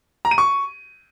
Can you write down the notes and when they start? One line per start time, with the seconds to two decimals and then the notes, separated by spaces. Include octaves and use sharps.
0.25 A#5
0.31 D#7
0.38 C#6